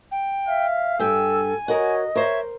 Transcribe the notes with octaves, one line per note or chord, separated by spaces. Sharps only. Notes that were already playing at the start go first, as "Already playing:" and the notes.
G5
E5 F5
G2 A4 G5 G#5 E6
F#4 A#4 C#5 D#5 F#5
A#4 C5 C#5 E5